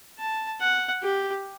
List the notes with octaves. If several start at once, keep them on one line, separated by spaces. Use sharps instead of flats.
A5
F#5
G4